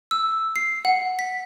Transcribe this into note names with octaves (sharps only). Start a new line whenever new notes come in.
E6
C7
F#5
B6